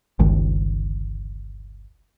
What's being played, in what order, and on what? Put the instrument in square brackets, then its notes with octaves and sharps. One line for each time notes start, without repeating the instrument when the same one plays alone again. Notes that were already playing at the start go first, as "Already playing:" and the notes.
[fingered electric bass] G1 C#2 D#3